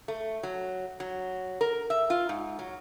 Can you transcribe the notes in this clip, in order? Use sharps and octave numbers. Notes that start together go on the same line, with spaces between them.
A3
F#3
F#3
A#4
E5
F4
G#2
F#3